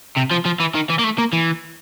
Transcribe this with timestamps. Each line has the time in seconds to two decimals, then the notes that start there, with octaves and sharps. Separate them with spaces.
0.17 C3
0.31 F3
0.46 F3
0.60 E3
0.75 D#3
0.90 E3
0.99 A#3
1.04 A3
1.18 A#3
1.33 E3